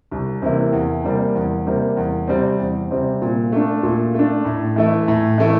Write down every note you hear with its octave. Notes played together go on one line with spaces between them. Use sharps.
C2
C3 E3 A#3 E4
E2
C3 G3 A#3
E2
C3 G3 A#3
E2
C3 G3 C4
E2
C3 G3 C4
A#2
A3 D4
A#2
A3 D4
A2
E3 A3 E4
A2
E3 A3 E4